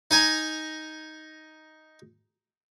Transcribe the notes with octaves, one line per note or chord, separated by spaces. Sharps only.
D#4 D#5 G#5 A#5